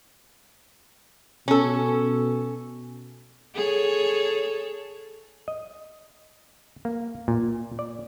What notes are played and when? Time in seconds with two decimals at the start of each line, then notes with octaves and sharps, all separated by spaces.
1.48 B2 C#4 A4
3.55 G#4 A4 C#5
5.48 D#5
6.85 A#3
7.28 A#2
7.79 D5